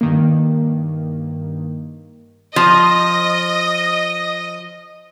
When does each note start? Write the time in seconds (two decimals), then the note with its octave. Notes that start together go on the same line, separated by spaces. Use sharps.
0.01 G2 D#3 A#3
2.56 F3 D#5